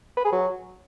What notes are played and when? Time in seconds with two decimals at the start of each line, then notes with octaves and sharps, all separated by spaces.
0.17 B4
0.25 G#4
0.32 F#3